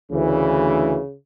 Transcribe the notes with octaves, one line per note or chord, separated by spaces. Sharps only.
D2 C#3 E3